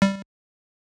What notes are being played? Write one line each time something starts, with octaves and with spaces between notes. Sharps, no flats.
G3